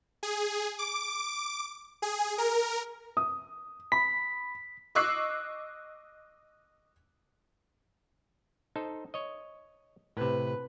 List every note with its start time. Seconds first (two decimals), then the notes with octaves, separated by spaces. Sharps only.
0.23 G#4
0.79 D6
2.02 G#4
2.38 A#4
3.17 D#6
3.92 B5 B6
4.95 D#5 C#6 D6 E6 F#6 C7
8.76 D#4 A4 C5
9.14 C#5 D#5
10.17 A2 C3 B4